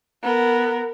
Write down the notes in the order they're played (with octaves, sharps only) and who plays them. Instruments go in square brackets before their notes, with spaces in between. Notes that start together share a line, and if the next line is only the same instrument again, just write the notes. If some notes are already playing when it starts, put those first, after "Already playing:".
[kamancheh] B3 A#4